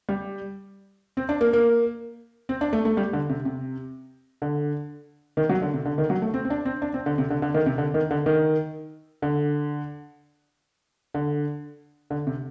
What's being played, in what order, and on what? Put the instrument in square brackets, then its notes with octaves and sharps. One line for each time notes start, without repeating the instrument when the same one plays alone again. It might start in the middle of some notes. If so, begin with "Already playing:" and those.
[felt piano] G3
C4
D4
A#3
A#3
C4
D4
A3
A3
G3
D3
C3
C3
D3
D#3
F#3
D3
C3
D3
D#3
F#3
A3
C4
C4
D4
C4
D4
C4
D3
C3
D3
D3
D#3
C3
D3
D#3
D3
D#3
D3
D3
D3
C3